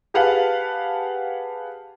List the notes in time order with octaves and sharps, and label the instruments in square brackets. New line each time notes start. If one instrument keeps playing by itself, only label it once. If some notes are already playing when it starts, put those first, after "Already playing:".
[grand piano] G4 G#4 B4 F5 F#5 A5